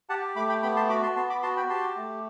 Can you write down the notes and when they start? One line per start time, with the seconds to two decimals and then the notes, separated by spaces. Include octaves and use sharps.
0.09 G4 F#5 A5
0.36 A3 B5 D6
0.49 G5 B5
0.63 B3 G5 B5
0.76 A5 C6
0.89 F#4 B5 D6
1.03 A5 C6
1.16 B3 A5 C6
1.30 B5 D6
1.42 F#4 A5 C6
1.57 G5 B5
1.69 G4 A5 C6
1.97 A3